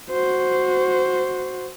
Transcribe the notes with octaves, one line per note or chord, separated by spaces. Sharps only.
F#4 C5